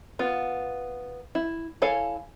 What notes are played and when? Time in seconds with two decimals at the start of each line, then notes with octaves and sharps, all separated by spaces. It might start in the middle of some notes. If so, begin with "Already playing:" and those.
0.19 B3 F4
1.35 E4
1.82 E4 A4 C#5 F5 G#5